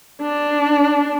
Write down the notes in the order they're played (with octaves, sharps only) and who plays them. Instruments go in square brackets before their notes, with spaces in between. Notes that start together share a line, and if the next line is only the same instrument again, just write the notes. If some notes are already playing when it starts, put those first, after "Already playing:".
[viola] D4